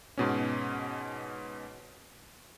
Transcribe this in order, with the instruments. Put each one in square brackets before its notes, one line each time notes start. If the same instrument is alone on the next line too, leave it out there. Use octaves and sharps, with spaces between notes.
[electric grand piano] G#2 B2 C#4